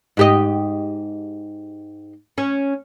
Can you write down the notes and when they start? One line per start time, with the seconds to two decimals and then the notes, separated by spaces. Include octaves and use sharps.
0.17 G#2 G4 D#5
2.38 C#4